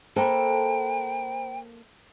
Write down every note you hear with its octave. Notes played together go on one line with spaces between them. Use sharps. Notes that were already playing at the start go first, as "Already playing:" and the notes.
A#3 A4 C5 G5 A#5 B5